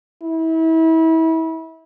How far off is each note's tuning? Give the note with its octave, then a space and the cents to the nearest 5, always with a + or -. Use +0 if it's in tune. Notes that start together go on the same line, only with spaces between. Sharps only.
E4 -30